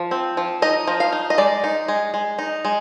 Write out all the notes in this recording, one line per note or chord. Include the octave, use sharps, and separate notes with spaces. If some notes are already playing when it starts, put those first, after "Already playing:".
Already playing: F3
C4
F3
D#4 D#5
F3
F5
D#4
D#5
G#3 D5
D#4
G#3
G#3
D#4
G#3